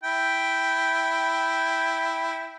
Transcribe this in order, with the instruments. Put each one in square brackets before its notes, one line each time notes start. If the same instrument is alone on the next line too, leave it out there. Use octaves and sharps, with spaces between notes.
[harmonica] E4 G5